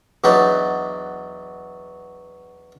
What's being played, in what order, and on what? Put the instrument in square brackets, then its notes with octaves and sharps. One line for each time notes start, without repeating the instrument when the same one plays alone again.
[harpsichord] E2 F#3 D4 D#4 B4